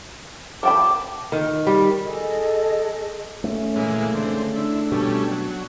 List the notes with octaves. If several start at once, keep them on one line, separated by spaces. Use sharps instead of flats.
F3 G5 B5 D6
D#3
G3
G#4 A4 D#5
A3 C#4
A#2 C#3 E3 G#3
D3 C4
D4 E4
B2 G3 A3 C#4
F#3